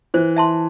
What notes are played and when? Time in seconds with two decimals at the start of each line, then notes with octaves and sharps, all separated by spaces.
0.14 E3 C5
0.36 E5 A5 C6